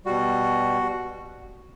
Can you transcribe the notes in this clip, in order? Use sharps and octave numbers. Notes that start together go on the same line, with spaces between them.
B2 G3 F#4